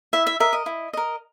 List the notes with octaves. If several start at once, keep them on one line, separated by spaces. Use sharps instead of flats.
E4 E5
E5
A#4 D#5 E5
D#5
E4
A#4 D#5